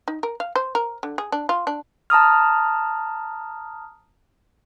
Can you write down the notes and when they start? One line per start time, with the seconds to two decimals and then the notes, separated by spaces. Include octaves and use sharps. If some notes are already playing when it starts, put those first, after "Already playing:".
0.08 D#4
0.23 A#4
0.40 F5
0.56 C5
0.75 A#4
1.03 D3
1.18 G#4
1.32 D4
1.49 F4
1.67 D4
2.10 A5 A#5 D#6 F6